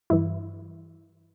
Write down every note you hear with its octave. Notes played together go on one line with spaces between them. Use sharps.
G2 E3 E4